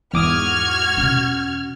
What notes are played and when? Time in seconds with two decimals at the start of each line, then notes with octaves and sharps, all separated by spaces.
0.13 E2 G#2 G#3 F#4 D6 D#6 F6 G#6
0.97 B2 C#4